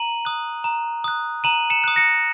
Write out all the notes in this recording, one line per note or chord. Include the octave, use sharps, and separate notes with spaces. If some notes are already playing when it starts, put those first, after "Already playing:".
Already playing: A#5 D#7 F#7
D#6 F#6
A#5
D#6 F#6
A#5 D#7 F#7
C#7 E7
D#6 F#6
A#6 C#7